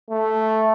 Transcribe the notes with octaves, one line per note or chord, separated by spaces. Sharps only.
A3